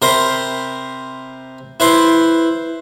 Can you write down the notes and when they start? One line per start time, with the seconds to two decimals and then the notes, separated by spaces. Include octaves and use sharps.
0.02 C3 A#4 C5 B5 C6
1.80 E4 B4 C5 C6